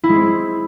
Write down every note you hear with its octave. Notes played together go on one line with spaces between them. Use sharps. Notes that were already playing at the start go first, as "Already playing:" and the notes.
E4
G#3
C4